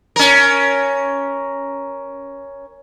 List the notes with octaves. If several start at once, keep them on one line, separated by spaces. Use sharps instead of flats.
C#4 A#4